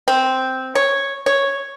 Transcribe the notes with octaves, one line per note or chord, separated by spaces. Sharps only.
C4
C#5
C#5